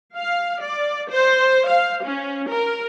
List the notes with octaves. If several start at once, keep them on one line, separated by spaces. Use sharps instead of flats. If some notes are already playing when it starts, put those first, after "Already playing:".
F5
D5
C5
F5
C#4
A#4